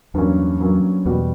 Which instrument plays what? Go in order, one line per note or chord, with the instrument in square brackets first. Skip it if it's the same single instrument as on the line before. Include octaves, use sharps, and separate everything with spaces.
[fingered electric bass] E2 [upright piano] G2 F#3 A#3 C#4
[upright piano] G2 F#3 A#3 C#4
[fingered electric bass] E2 [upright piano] B2 G3 B3 F#4